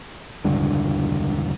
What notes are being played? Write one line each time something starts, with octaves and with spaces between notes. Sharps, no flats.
E1 C#2 G2 D3